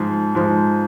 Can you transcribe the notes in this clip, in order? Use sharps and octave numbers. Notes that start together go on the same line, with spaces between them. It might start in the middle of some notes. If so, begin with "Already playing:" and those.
Already playing: G#2 F3
G#2 F3